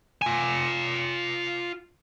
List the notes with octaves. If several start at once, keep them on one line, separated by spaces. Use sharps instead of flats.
F4 G#5